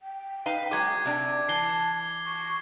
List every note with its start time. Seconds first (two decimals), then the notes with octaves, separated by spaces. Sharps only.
0.02 G5
0.46 D#4 B4 F5
0.71 F#3 G#3 G#4 D6 G#6
1.05 C3 D4
1.49 E3 A5 C7 G7
2.26 C#6